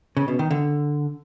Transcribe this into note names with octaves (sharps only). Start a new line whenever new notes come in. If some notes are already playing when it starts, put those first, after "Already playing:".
C#3
B2
D#3
D3